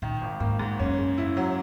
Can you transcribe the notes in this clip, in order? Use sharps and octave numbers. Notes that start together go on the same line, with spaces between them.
A#2 D#3
G#1
G#2 A#3
G#2
F#2 C#4
C#3
E4
F#3